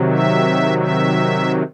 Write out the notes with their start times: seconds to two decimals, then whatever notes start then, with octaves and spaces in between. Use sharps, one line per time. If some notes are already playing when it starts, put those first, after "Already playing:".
Already playing: C3 D#3 F#3
0.08 E5
0.78 E5